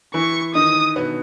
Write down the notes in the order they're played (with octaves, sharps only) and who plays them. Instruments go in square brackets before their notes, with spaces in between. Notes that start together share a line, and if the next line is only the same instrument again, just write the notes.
[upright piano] E3 E4 [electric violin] C#6
[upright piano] D#3 D#4 [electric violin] D#6
[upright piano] B2 B3